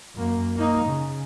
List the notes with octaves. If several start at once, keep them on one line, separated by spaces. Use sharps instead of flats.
F#2 A#3
A#3 D#4
C#3